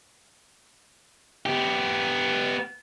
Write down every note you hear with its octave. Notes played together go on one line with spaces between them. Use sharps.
B3 G4